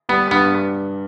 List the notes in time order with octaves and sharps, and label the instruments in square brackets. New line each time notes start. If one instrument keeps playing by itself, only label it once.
[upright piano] G3 [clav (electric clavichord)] B3
[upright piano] G2 [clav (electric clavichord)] B3